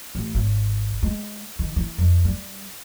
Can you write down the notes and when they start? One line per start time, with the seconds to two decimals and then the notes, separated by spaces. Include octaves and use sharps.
0.15 A1
0.34 G#1
1.03 G#3
1.59 D#3
1.76 E3
1.98 F2
2.25 G3